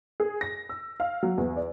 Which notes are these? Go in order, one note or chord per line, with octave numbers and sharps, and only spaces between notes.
G#4
A#6
E6
F5
F#3
E2
D5